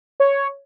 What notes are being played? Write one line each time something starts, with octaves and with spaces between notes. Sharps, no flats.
C#5